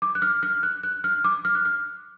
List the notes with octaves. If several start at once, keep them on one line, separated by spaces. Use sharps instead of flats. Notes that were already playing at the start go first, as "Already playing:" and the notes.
D6
F#6
F6
F6
F#6
F#6
F6
D6
F6
F#6
F6